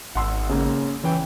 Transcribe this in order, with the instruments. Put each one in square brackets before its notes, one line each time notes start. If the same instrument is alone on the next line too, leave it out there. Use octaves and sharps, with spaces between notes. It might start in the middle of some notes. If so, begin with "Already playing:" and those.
[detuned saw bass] G#1 [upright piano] F#5 C6 E6
[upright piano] C#3 A#3
[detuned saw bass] E3 [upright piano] C#4 G5